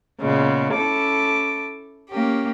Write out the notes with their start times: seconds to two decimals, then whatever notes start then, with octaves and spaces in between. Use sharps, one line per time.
0.21 A#2 C#3 G#3 B3
0.73 C#4 E4 A4 D6
2.10 A#3 C#4 G4